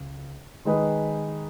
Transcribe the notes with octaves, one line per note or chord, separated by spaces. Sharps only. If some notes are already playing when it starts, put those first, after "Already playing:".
Already playing: C#2
D#3 G#3 D#4 G#4 B4